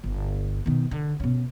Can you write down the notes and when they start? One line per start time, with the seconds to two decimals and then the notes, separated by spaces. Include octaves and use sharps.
0.04 G1
0.66 B2 D#3
0.91 D3
1.20 B2 C#4